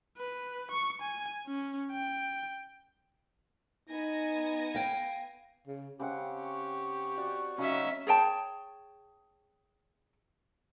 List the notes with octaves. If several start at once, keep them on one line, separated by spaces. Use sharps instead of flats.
B4
C#6
G#5
C#4
G5
B3 D#4 G#5 A#6
F5 G5
C#3
C#3 C4 G4 F#5
C#6
F#4 D5
C#3 F#3 C#4 D#4 E5
G#4 C#5 G5 A5